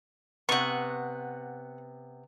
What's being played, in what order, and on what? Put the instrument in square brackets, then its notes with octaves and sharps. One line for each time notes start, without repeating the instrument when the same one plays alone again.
[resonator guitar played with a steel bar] C3 B3 [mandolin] F#5 C#6